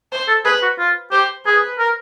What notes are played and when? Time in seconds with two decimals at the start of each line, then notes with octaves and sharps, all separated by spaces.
0.12 C5
0.28 A4
0.45 G#4 B4
0.62 F#4
0.79 F4
1.12 G4 C5
1.46 G#4 B4
1.79 A#4